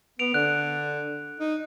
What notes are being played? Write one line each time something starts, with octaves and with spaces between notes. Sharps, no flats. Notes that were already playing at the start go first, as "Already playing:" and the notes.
B3 D7 F7
D3 F#6
D#4